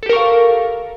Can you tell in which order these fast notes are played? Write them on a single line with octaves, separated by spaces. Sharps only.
A4 G4 A#4 C#6 F5